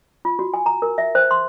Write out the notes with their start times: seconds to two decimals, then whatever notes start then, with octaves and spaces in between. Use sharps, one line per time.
0.25 F4
0.39 F#4
0.54 G#5
0.66 A#5
0.82 A#4
0.98 E5
1.15 C5
1.31 C6